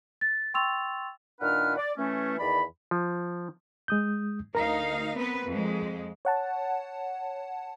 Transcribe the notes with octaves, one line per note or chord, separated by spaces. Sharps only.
A6
G5 C6 C#6 E6 A6 F7
A#2 D#3 D4 B4 F#5 F6
D5
E3 A3 C#4
E2 D#3 D5 B5
F3
G#3 D#6 G6
D2 D#4 A#4 F5 A#5
B3 C4 B4
F2 G#3
C#5 F#5 A5